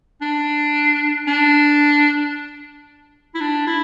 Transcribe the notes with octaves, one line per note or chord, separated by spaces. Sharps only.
D4
D4
E4
D4
E4